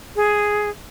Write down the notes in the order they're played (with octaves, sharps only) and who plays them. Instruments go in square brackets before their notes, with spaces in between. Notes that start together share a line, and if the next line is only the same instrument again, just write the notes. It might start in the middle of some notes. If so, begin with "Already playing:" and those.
[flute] G#4